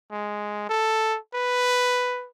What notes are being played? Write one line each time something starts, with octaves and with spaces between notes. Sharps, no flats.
G#3
A4
B4